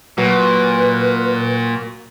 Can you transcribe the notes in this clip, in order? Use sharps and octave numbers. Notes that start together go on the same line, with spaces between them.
A#2 F#3 F#4 B4